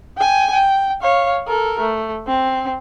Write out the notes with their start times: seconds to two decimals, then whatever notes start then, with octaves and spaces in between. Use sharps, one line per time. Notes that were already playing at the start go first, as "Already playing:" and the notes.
0.18 G5 G#5
0.53 G5
1.01 C#5 F5
1.47 A4 A#4
1.80 A3
2.27 C4